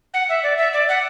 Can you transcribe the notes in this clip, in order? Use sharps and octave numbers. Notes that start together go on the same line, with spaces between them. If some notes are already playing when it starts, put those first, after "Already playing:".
F#5
E5
D5
E5
D5
F#5